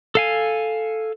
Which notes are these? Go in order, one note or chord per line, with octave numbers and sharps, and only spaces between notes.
A4 F5 G#5